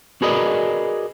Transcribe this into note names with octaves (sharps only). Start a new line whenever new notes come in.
F#4 G#4 A#4 B4 D5 D#5